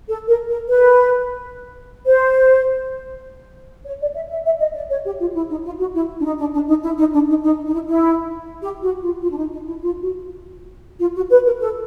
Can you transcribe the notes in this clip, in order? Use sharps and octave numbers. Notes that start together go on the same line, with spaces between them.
A4
A#4
A#4
B4
C5
C#5
D5
E5
E5
E5
D#5
D5
C#5
G4
F4
E4
D#4
F4
F#4
E4
D4
D#4
D4
D4
D#4
E4
D#4
D4
D#4
D#4
D#4
E4
E4
G4
F#4
F4
F4
D4
D#4
D#4
E4
F4
F#4
F4
F#4
B4
A#4
A4